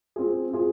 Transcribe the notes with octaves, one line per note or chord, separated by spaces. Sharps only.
C4 F4 G#4
C4 F4 G#4